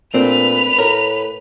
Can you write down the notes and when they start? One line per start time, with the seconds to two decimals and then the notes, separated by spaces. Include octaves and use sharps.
0.14 A#2 A3 C4 D4 B4 F7
0.78 A2 A#4